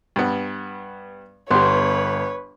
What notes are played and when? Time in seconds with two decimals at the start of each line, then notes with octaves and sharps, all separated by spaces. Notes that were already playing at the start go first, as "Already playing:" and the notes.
0.16 G2 B3
1.51 G1 B3 G4 B4 C#5 C6